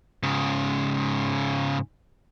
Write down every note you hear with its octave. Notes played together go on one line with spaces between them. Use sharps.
G#2 C#3